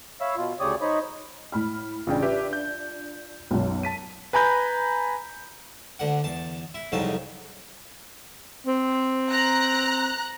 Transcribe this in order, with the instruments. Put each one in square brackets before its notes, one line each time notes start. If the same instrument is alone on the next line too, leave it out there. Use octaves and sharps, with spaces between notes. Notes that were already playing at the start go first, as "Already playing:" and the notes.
[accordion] C#5 E5 F5 B5 E6
B2 F4
D2 C#3 G4 C#5 D5 D#6
D#4 C5 C#5 D#5 B5
[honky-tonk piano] A2 B5 F6
[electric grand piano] A1 C#3 G5 [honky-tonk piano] D4 F4
[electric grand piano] G4 B4 E5
G6
[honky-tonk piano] B1 F#2
[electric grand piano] A5 B6 D#7
B4 G#5 A#5 B5 G6
[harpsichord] D2 D3 F#5
E2 A5
E4
C2 F2 C#3 F#3 D#4 A4
[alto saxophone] C4
[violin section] A#5 F#6